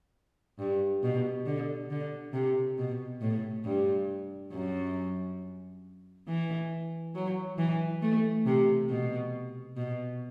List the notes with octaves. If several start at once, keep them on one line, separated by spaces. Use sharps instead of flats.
G2
B2
D3
D3
C3
B2
A2
G2
F#2
E3
F#3
E3
A3
C3
B2
B2